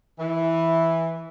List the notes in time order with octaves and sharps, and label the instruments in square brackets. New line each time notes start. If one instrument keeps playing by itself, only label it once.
[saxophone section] E3